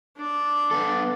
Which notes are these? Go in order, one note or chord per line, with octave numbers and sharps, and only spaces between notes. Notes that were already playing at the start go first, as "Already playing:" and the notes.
D4 D5
B3 A4